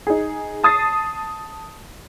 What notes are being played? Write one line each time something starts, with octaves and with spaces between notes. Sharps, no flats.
D#4 G#4
A5 D#6 A6 C7